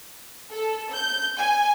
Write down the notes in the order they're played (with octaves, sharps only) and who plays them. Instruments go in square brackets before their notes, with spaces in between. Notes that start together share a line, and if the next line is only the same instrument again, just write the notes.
[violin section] A4
G6
G#5